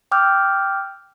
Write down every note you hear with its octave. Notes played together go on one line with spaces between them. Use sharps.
G5 D6 E6 F6 G6